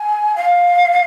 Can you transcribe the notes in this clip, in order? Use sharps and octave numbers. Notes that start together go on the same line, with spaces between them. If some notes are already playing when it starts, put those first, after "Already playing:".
Already playing: G#5
F5